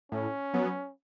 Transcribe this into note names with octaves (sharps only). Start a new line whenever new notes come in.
A2 C#4
F#3 B3